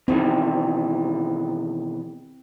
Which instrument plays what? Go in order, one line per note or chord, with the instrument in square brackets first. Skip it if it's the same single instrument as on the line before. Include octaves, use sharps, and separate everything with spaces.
[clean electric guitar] B2 D#3 E3 [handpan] C4